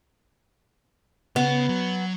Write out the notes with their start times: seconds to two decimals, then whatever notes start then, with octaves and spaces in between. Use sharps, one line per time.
1.36 C#3 B3
1.69 F#3